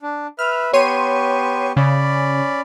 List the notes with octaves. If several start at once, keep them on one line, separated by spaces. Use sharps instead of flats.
D4
B4 E5 F6
B3 G4 C#5 C6 C#6 D#7
C#3 C#4 D5 B5